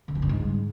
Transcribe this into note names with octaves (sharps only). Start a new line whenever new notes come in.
D3
F3
G2
G#2